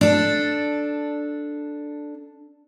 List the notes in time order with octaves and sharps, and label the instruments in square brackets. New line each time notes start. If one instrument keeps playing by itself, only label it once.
[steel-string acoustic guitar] D4 A4